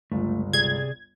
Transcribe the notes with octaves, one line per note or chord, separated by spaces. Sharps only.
G1 C#2 A3
C3 G#4 D5 G#6